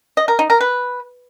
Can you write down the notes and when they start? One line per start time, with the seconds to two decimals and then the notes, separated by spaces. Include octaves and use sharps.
0.17 D#5
0.28 A#4
0.39 D#4
0.50 A#4
0.61 B4